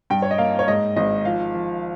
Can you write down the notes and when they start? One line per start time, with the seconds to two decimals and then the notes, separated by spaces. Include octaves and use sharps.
0.10 G2 G5
0.22 C#5
0.31 D#5
0.38 A#3 F5
0.59 C#5
0.68 G#2 D#5
0.96 G#1 D#5
1.25 F3 F5
1.54 F3